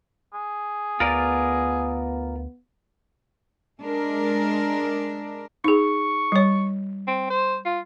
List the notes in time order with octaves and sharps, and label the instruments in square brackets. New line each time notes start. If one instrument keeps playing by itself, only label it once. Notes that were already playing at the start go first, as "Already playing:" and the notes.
[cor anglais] G#4
[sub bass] D2 [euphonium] B3 [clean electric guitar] F4 A#4 D5
[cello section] G#3 D4 A#4
[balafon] D#4 G#4 [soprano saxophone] C#6
[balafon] G3 C#5
[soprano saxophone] C4
C5
F4